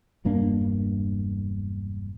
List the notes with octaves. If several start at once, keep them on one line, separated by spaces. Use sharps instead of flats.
E1 G2 A#3 D4